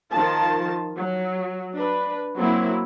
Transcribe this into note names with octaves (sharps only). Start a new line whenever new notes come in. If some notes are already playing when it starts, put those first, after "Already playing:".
D#3 F3 F4 A#4 A5
F#3
D4 B4
F#3 A#3 C4 E4